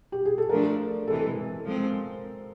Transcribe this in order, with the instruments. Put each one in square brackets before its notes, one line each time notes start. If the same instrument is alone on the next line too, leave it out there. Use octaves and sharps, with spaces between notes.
[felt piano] G4
G#4
A4
[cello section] F3 A3 D4 [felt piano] A#4
[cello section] C3 E3 G#3 [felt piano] A4
[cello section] F3 G#3 C4